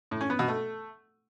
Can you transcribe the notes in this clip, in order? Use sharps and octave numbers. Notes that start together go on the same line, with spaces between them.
A2
C#4
B3
B2
A3